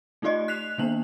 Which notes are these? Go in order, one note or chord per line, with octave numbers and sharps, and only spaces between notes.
A3 D#4 F4 G4 D5 D#5
F#6 B6 C7 F7
D#3 A#3 B3 D4 C5 F#7